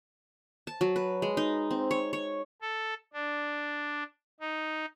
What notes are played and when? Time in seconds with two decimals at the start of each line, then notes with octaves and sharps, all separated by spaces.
0.67 A5
0.81 F#3
0.96 B4
1.22 G#3
1.37 D#4
1.71 C4
1.91 C#5
2.13 C#5
2.62 A4
3.13 D4
4.40 D#4